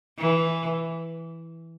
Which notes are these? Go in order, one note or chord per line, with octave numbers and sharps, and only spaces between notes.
E3